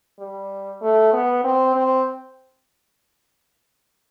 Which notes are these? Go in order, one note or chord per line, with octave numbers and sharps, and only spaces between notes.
G3
A3
B3
C4
C4